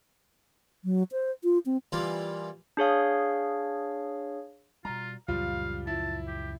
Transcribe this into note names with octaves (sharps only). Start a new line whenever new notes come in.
F#3
C5
F4
C4
E3 G3 A#3 F4
D4 G#4 C#5 F5
B2 G3 F4 A#5
C#2 F#2 A#2 F3 G3 F4 F5
F3 E4 A5
G4